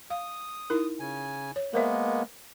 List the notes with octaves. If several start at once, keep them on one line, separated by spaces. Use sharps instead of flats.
F5 D#6
D#4 E4 A#4
C#3 G#5
C#5
G#3 A#3 B3 A#4 C5 E5